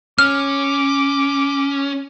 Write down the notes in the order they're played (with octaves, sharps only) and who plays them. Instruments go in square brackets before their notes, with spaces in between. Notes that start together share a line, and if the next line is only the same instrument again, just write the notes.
[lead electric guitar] C#4 [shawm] D6 [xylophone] F6